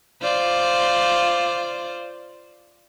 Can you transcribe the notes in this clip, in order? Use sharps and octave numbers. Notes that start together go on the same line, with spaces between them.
F4 C5 D5